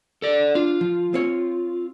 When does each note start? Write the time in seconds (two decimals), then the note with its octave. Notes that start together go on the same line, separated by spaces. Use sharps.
0.22 A4 D5
0.55 D4 F4
0.81 F3
1.14 C4 C#5